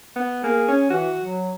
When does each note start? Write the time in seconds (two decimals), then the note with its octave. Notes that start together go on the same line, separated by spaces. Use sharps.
0.16 B3
0.43 A#3 G#4
0.68 C#4
0.90 E3 F#4
1.21 F#3